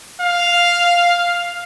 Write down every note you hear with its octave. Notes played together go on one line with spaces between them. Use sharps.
F5